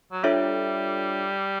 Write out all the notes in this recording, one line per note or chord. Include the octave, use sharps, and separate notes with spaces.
F#3
G3 D4 F4 A4 C#5 E5